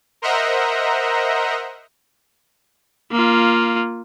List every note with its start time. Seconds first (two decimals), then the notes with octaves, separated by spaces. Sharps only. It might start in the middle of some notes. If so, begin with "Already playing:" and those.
0.22 A#4 C5 D#5 E5 F#5 A#5
3.12 A#3 F4